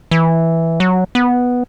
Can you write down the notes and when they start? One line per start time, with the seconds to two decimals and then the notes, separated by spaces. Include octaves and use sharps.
0.11 E3
0.80 F#3
1.15 B3